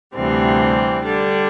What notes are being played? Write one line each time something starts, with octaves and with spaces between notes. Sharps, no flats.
D2 C3 E3 G3 C4
D3 G3 D4